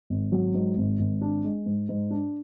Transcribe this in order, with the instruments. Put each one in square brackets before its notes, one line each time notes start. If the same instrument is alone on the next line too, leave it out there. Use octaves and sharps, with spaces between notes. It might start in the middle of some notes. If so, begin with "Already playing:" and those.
[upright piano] G#1
F#3
G#2
G#1
G#1
D4
G#3
G#2
G#2
D4